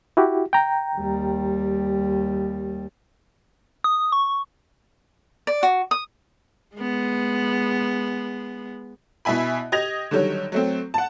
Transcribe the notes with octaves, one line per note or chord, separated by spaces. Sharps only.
E4 F#4 G4
G5 A#5
D#2 G3
D#6
C#6
D5
F#4
D#6
G#3 B3
B2 E4 E5 G#5 B5
G4 D#5 G#6 A#6 F7
D3 D#3 F#3 G3 C#5
F#3 A3 C4
F#5 A5